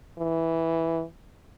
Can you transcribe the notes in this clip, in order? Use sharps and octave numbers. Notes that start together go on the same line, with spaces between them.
E3